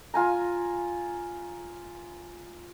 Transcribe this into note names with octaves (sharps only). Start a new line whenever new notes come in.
F4 G#5 A#5